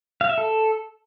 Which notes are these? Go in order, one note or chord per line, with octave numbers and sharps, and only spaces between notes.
F5
E5
A4